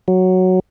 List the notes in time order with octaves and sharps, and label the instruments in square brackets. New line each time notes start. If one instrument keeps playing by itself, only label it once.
[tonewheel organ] F#3